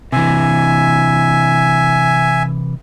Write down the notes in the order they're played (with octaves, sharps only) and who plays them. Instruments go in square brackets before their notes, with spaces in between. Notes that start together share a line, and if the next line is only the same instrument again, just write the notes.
[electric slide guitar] C3 E3 [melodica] E5 G#5